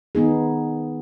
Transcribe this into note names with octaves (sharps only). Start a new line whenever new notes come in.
D#3 B3 D#4 G#4